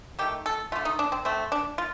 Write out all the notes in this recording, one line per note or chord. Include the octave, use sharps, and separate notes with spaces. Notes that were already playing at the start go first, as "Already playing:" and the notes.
D#3 A3 G4
A4
D3 A3 F4
D#4
D4
C4
D3 A3 C4
D4
F4